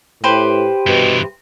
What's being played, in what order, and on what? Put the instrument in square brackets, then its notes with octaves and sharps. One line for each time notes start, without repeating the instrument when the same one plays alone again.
[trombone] A2 [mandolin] G4 B4 C5
[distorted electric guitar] G2 E3 [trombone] B2